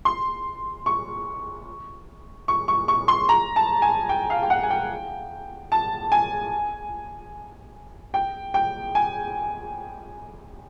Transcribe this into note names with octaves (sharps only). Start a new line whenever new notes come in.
C6
C#6
C#6
C#6
C#6
C6
A#5
A5
G#5
G5
F5
G5
F#5
G#5
G5
A5
G#5
G5
G5
G#5